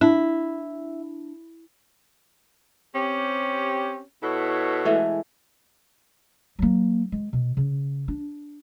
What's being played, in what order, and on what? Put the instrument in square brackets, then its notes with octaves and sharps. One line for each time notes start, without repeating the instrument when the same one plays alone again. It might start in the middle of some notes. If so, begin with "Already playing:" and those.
[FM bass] D4 [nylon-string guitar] E4
[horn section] C4 G4 [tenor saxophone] C#4
[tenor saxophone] B2 [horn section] E4 A4 C#5
[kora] E3 G#3 A3
[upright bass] F#3 A#3
G#3
B2
C#3
D4